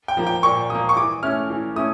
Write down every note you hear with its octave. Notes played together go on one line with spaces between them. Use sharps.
G5
F3 A#3
G5
A#2 C#6
F3 A#3 D#6
C#6
E3 D6
A3 C#4 E4 F6
E3
A3 C#4 E4 D#6